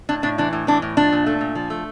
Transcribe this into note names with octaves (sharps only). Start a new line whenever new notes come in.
A2 D4
A2 D4
E3 D4
A2
E3 D4
A2
F3 D4
A#2
A3
A#2
F3
A3